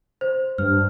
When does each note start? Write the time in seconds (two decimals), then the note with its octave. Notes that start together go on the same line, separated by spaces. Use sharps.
0.21 C5
0.58 G2 F6